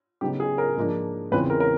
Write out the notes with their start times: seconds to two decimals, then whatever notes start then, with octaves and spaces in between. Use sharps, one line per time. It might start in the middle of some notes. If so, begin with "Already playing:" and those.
0.21 C#3 F#3 B3 D#4 G4
0.40 G#4
0.58 A#4
0.76 G#2 F3 A#3 D4
1.32 E2 C#3 E3 G#3 C4 B4
1.50 A#4
1.60 A#4